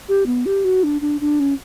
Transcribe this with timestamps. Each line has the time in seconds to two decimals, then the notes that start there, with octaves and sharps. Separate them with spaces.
0.08 G4
0.26 B3
0.46 G4
0.64 F#4
0.83 D4
1.01 D4
1.21 D4
1.40 C#4